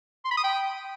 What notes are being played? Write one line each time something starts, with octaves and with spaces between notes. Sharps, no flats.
C6
B5
D#6
G5